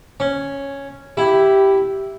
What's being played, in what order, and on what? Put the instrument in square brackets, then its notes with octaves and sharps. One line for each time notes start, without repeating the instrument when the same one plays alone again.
[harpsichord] C#4
[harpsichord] E4 [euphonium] G4